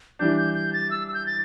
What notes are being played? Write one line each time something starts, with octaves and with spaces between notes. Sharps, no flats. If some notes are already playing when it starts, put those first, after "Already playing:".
E3 G3 D4 G6
G6
G6
A6
E6
E6
G6
A6